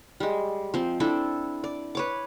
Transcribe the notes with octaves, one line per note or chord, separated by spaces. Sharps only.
G3 G#3
F3 C4
C4 D4 E4 A4
D5
B4 C#5 D6